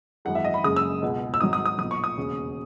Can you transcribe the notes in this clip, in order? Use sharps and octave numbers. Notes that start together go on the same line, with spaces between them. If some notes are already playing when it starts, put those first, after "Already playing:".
G#1 F#2 E3 G#3 F#5
E5
D#5
B5
F#1 F#2 C#3 G#3 D#6
E6
C#2 B2 G#3
E6
G#1 G#2 F#3 D#6
D#6
D#6
B1 A#2 F#3 D#6
C#6
D#6
E1 D#2 C#3